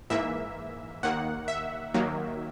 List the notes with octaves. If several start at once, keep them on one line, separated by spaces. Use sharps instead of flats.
G#2 E3 A#3 E5
D#2 D#3 A#3 F#5
E5
D#2 D#3 F#3 A#3